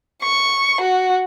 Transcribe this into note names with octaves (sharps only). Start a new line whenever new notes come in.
C#6
F#4